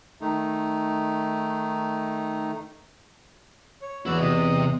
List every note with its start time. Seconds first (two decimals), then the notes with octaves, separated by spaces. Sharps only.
0.21 D#3 A3 D#4
3.82 C#5
4.06 E2 E4 F#4 D5 E6
4.20 C3 D#5